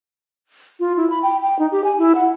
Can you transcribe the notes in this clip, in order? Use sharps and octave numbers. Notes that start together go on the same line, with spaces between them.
F4
E4
B5
G5
G5
D#4
G4
G#5
E4
F#5